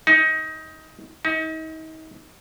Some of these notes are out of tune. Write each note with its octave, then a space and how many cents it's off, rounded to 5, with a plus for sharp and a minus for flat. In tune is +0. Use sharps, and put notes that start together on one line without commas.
D#4 +20
D#4 +35